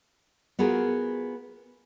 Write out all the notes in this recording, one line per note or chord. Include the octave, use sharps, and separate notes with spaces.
B3 F4 F#4 G#4 A#4